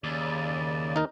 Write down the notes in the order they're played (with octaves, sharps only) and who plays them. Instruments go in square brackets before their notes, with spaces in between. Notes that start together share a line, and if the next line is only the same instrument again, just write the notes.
[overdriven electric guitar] D#2 [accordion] C#3 D5
[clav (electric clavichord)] D#4 A#4